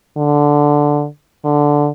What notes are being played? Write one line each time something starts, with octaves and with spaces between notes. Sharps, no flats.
D3
D3